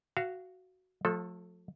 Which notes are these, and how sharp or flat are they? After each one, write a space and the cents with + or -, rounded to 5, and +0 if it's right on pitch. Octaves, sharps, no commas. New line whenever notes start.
F#4 +0 F5 -25
F3 +40 A3 +0 A4 -5